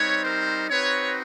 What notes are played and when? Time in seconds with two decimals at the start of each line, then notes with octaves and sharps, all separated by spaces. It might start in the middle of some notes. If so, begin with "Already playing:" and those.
Already playing: G3 C4 D#4 B4 C#5
0.23 A#4 C5
0.70 C4 D#4 F#4 B4 C#5